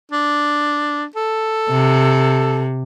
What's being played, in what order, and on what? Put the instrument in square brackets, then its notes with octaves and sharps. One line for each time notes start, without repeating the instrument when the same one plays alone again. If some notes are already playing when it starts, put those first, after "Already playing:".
[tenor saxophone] D4
A4
[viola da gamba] C3